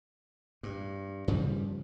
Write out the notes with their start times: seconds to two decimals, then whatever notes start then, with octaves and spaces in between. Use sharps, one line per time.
0.63 G2
1.28 G2 C#3 F3 G3